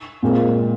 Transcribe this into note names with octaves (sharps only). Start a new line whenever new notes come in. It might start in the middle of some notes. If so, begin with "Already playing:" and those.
A#2 G#3 C4